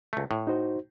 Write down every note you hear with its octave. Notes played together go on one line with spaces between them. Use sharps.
C#2 A3
A2
D#4 F#4 C5